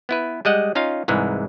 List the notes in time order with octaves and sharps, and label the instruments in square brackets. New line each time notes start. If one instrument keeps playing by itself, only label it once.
[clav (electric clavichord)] B3 E4 B4
G3 G#3 D#5 F#5
C#4 D#4 F4 F5
C2 G#2 E3 G#3